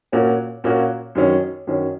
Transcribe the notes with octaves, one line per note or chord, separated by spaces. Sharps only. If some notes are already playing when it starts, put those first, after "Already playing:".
A#2 A#3 C#4 F#4
A#2 A#3 C#4 F#4
F#2 D#3 F#3 C#4
F#2 D#3 F#3 C#4